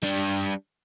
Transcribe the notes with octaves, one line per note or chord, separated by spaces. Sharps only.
G3 D4